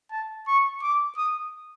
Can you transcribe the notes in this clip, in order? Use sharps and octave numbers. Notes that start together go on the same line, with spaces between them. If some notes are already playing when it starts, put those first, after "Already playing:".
A5
C#6
D6
D#6